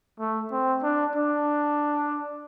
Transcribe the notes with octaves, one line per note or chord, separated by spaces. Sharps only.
A3
C4
D4
D4